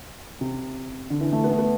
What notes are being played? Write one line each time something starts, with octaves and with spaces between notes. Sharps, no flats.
C3
D3
E3
A3
B3
A3
B3